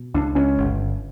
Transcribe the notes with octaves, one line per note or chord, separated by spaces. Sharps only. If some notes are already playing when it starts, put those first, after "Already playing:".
Already playing: B2
C#2 D4
C#2 C#4
G1
G2